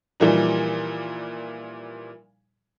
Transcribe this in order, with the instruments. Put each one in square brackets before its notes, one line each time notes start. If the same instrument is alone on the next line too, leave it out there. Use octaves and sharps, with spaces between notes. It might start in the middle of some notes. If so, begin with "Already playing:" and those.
[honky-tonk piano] A#2 E3 F3 G3 A#3 D#4